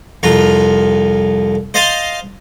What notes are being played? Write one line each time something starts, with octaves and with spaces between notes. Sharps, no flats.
C2 F2 F4 A#5
C5 D#5 F5 A5 C6